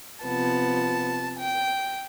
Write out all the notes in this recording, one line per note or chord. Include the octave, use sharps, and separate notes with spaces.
C3 F3 B3 A5
G5